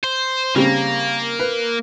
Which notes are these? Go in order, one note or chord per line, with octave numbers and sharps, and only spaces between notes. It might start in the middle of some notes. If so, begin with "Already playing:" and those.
C5
C#3 G3 A#3 C4
B4